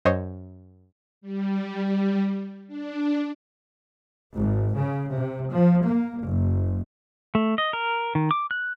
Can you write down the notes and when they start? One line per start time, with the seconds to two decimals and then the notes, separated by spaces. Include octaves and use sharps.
0.05 F#2 C5 C#5 D#5
1.21 G3
2.67 D4
4.35 G#1
4.76 C#3
5.13 C3
5.52 F3
5.86 A#3
6.22 F#1
7.35 A3
7.58 D#5
7.73 A#4
8.15 D#3
8.31 D6
8.51 F#6